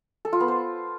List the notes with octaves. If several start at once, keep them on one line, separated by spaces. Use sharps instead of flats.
A4
F4
B3
C5